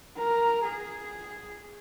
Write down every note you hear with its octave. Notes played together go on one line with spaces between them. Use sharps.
A#4
G#4